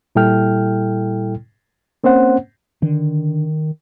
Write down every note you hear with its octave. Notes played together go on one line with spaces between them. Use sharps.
A#2 G3 E4 A4 G5 F6
A#3 C4 C#4 C5 F#5
D3 D#3